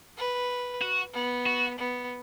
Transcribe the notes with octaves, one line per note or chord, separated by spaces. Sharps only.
B4
F#4
B3
F#4
B3